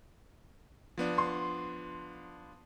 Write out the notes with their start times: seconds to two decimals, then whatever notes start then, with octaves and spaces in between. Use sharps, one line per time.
0.98 F3 B3 D4
1.18 C6